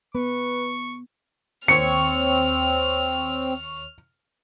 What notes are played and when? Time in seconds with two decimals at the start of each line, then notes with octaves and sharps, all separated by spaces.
0.15 B3 B4 C#6
1.68 D#2 C4 C#5 C#6 F6 C#7